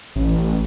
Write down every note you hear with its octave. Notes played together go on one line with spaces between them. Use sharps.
A1